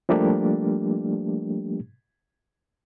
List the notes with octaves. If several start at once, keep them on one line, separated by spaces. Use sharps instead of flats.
F3 G3 A3 A#3 D4 G4